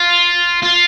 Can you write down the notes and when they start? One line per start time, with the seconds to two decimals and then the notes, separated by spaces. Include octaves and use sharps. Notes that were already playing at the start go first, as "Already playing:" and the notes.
Already playing: F4
0.63 F4